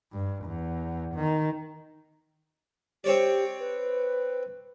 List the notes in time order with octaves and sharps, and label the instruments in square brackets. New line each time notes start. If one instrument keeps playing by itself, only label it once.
[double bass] G2
E2
D#3
[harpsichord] C4 C#5 D5 [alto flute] G4
[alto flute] B4